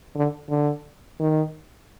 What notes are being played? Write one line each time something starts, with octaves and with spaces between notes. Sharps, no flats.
D3
D3
D#3